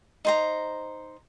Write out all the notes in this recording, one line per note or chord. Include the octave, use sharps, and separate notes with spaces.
D#4 C5 A#5